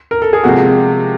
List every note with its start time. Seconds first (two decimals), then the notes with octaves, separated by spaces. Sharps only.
0.11 A#4
0.22 A4
0.33 G#4
0.44 C3 F3 G#3 F#4